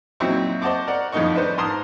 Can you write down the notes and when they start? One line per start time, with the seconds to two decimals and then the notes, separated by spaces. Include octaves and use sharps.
0.20 A#2 F#3 C4 D#4 E4 C#6
0.62 C5 D#5 F#5 A5 C#6 D6
0.87 A#4 D5 F#5
1.12 F2 A2 D#3 D#4 D#5 C#6
1.35 D4 B4 C5
1.58 G#2 A#4 A5 C6 D#6